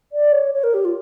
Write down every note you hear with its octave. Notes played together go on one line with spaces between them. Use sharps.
D5
C#5
C#5
A#4
G4
F4